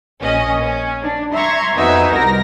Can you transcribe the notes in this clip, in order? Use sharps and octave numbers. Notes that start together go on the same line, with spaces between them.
A#1 C#4 D#5
C#4
D4
E5 A#5 C6 C#6 G#6
F2 B2 D#4 E5 G#5
C2 A#4 A#6